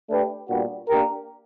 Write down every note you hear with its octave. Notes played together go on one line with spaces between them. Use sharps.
A3 D4 G4 B4
A#2 G3 B3 D4 F#4
A#3 D4 G4 A#4